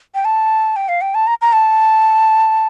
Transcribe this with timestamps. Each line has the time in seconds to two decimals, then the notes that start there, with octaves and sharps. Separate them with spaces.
0.15 G5
0.25 A5
0.76 G5
0.88 F5
1.01 G5
1.15 A5
1.27 A#5
1.42 A#5
1.53 A5